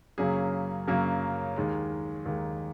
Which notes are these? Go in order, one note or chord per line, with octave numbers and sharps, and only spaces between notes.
F#2 C#3 F#3 A#3 G#4
F#2 C#3 F#3 A#3
D#2 D#3 G#3
D#2 D#3 G#3